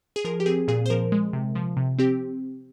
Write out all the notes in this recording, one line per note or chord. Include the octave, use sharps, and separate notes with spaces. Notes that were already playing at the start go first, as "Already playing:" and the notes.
G#4
F3 A#4
G4
C4 G#4
A#2 G#4
C5
F3 A#4
G#3
C3
F3
C3
C4 G4